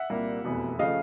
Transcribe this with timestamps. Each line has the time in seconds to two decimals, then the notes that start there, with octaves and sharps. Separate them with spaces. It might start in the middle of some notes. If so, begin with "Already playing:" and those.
Already playing: E5 F#5
0.10 C2 A#2 G3 A#3
0.44 F1 E2 B2
0.78 C#3 F3 A3 D#5 F5